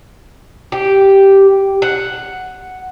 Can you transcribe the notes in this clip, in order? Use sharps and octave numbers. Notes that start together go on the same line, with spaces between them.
G4
F#5